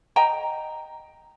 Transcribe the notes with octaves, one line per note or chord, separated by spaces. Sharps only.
D#5 G5 A#5